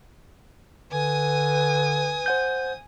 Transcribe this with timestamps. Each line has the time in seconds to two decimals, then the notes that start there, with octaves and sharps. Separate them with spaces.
0.92 D3 B4 G#5 D#6
2.26 C5 F#5 G6